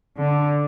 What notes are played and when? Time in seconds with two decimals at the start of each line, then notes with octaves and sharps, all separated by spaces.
0.17 D3